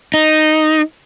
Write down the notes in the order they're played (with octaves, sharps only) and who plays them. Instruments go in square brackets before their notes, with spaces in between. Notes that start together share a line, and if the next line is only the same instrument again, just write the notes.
[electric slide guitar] D#4